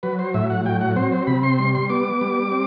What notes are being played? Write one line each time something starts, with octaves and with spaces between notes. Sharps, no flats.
F#3 B4
C5
A2 E5
F#5
F#3 G5
F#5
C4 C5
C5
C3 B5
C6
G3 C6
C6
B3 D6
G3
C4